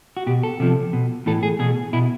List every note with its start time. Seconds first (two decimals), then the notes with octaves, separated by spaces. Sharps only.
0.17 F#4
0.27 B2 G4
0.43 A4
0.60 C3 F3
0.93 B2
1.26 A2 E3 A4
1.43 G#4
1.59 B2 G#4
1.93 B2 E4